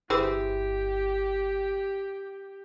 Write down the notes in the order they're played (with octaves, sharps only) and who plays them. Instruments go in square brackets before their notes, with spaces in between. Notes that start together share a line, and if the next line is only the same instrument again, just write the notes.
[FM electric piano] G1 [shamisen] E3 G#4 C5 [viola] G4